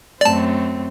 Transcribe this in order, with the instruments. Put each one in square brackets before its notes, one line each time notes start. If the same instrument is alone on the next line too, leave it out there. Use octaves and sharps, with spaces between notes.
[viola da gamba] F#2 A3 C4 [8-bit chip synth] D5 A5